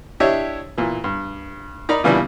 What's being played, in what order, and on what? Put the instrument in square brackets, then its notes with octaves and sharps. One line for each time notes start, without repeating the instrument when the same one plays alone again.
[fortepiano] D4 E4 G4 C#5 D#5 E5
A#2 E3
G2
D#4 A#4 D5 A#5 B5
A#2 C#3 E3 G3 B3 D4